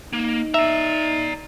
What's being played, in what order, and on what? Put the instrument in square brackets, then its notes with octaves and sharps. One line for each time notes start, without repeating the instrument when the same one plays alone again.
[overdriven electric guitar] A#3 [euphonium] D#4
[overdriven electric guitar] D5 A#5 [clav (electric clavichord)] E5